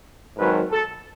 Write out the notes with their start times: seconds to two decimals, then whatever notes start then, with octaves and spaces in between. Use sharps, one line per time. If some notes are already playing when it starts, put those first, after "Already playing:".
0.37 G#1 G#2 D#3 F#3 B4
0.71 A4